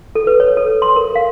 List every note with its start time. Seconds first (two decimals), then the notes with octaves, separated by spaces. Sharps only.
0.15 A4
0.27 B4
0.40 C#5
0.57 A4
0.82 C6
0.96 A#4
1.15 F5